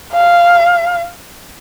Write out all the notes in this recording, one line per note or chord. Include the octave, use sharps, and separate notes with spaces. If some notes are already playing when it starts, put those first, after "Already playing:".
F5